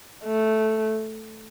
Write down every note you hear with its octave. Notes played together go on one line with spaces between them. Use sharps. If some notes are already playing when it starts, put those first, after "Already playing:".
A3